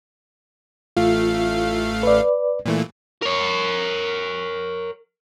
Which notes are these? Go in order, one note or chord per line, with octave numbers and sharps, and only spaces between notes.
A1 A3 F4 F5
B4 D5
A#2 E3 A3
A#4 C#5